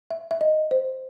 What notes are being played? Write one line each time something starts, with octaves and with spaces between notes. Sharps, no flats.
E5
E5
D#5
C5